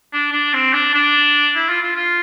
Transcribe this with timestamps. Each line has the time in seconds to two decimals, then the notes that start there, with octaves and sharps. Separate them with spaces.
0.13 D4
0.33 D4
0.53 C4
0.73 D4
0.94 D4
1.55 E4
1.69 F4
1.82 F4
1.95 F4